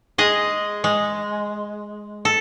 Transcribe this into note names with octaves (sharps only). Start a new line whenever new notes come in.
G#3 G#4 D#5
G#3
A4